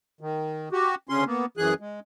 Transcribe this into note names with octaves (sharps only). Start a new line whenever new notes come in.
D#3
F#4 G4
D2 C#3 C#4 C6
A#3 B3
F#2 E3 G#4 F#6
G#3